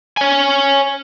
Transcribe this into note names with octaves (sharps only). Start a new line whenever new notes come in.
C#5 G#5